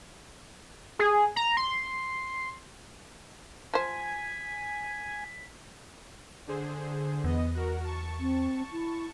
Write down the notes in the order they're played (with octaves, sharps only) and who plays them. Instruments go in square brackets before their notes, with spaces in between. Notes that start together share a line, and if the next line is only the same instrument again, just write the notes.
[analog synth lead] G#4
A#5
C6
[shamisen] F3 C5 [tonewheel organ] G#5 [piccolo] B6
[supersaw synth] D3 G#4 C5
[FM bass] E2 [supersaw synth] B3 D#5
[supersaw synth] F#4 A#4
A5 C#6
[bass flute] C4
E4